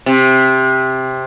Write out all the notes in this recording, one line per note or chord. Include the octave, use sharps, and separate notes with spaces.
C3